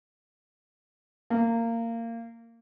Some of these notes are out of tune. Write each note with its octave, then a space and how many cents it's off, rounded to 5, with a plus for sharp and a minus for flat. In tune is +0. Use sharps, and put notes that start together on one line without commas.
A#3 -20